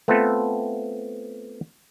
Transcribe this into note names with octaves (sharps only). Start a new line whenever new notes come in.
A3 B3 C4 F4 A4